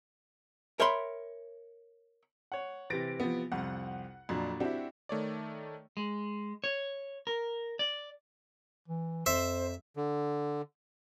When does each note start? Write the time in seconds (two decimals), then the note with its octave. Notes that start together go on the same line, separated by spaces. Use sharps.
0.80 A#4 C#5 E5 G5 B5 C6
2.52 C#5 F#5
2.90 C3 E3 A6 A#6 D7
3.20 F3 B3
3.52 C2 F2 F#5
4.29 F2 A#2 F#3 D4
4.60 C4 D4 E4 F#4 G4
5.09 D#3 A3 C#5 D5
5.97 G#3
6.64 C#5
7.27 A#4
7.79 D5
8.88 E3
9.26 F2 C5 E5
9.97 D3